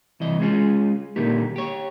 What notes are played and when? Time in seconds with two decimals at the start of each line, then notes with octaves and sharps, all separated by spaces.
0.20 C2 E3 D#5
0.40 G#3 C#4 F4 G#4
1.16 A#2 D3 D#3 A#3 G4
1.56 G4 C#5